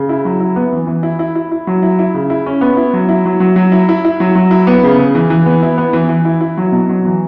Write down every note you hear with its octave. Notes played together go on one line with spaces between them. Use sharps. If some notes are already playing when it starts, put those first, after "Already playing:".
Already playing: C#3
E4
F#3
E4
B3
E3
E3
E4
E4
E4
E4
F#3
E4
E4
C#3
E4
C#4
B3
E4
F#3
E4
F#3
F#3
F#3
E4
E4
E4
F#3
F#3
E4
B3
C#3
C#3
E3
E3
B3
E4
B3
E3
E3
E4
E4
F#3
B2
F#3
E3